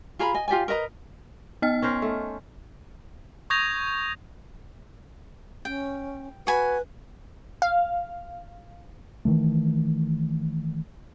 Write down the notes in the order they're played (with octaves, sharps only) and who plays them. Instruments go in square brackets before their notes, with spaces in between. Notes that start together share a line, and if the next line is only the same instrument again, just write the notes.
[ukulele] F4 G#4 A#5 B5
D#5 G#5
F4 G4 D5 G#5
A#4 B4 D#5 A#5
[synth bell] B3 D#5 F6
[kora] C#4 A#4 C5
A3
[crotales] C#6 D#6 G6 G#6 A#6 F7
[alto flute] C#4 [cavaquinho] G5
[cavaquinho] F#4 G#5 B5 [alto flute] B4
[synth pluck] F5
[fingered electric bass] D#3 E3 A3